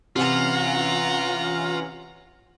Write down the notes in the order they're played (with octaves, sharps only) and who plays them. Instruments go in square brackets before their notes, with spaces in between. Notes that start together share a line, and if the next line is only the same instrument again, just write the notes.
[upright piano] C3 [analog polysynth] E3 C#4 [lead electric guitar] F4 [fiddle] F#5 A#5